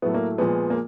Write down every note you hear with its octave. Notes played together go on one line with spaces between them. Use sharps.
A2 F#3 A3 B3
A#3
A#2 F3 G#3 B3
A#3